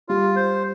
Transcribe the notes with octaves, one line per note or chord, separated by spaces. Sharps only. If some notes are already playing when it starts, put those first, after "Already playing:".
G3 F4
C5